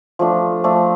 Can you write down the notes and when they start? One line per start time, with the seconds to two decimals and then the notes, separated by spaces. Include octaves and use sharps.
0.19 F3 A3 D4
0.64 F3 A3 D4